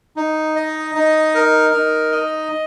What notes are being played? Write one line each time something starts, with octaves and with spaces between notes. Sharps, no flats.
D#4
D#5
D#4
A#4
D#4
D#5